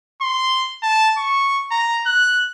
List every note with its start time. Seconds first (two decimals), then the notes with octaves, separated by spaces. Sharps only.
0.22 C6
0.83 A5
1.17 C#6
1.71 A#5
2.06 F#6